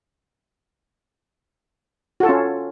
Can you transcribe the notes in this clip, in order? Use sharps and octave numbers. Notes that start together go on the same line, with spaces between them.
C#4 F4 F#4 A4